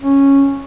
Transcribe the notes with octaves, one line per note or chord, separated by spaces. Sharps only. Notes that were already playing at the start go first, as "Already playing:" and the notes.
C#4